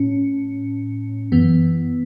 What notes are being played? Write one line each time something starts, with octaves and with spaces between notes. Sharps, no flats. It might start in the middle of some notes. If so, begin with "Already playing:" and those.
Already playing: A2 C#4
F#2 E3 B3